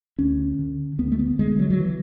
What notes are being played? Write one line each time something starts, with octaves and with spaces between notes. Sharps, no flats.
D2 C#4
D3
D2 B3
A3
B3
D3 G#3
F#3
F#3
E3